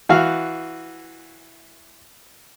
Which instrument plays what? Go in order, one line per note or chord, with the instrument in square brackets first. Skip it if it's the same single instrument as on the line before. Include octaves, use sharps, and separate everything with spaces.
[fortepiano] E3 F#4 F5